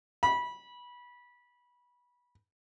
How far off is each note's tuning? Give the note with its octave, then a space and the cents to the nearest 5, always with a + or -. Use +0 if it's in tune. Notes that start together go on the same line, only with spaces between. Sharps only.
B5 -20